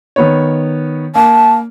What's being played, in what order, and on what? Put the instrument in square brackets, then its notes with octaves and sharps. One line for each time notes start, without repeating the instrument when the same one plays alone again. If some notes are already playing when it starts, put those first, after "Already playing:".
[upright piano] D#3 B3 C#5
[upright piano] A#3 [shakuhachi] A5